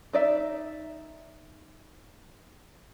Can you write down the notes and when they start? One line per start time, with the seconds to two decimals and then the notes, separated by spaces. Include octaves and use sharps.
0.13 D#4 D5 E5